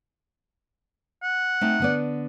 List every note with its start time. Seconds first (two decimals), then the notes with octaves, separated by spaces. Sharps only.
1.23 F#5
1.61 A3 C4 D#4
1.80 D3 B3 D5